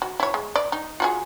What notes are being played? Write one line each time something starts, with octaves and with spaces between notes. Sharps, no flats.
F#4
E4 C#5
G#3
D5
D#4
F4 F#4 G#4